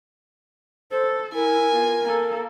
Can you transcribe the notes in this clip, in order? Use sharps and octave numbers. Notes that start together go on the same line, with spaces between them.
A4 C5
E4 A#4 G#5
B3 F4
A#3 A4